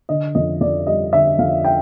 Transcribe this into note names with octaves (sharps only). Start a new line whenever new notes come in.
D3 D#5
F2 D#5
F2 D5
G3 D#5
D3 E5
F2 F5
G5